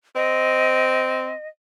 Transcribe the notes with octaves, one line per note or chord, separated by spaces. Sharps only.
C4 D#5